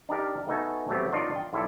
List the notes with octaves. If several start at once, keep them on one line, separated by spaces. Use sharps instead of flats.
D4 D#4 G4 A#4
A3 B3 D#4 F#4 A4 G#5
F#3 A3 B3 C4 G4
D4 D#4 F4 A#4 D5 D#5
G5
B1 E4 F4 A4 D5